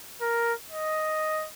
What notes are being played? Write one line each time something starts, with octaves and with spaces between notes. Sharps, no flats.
A#4
D#5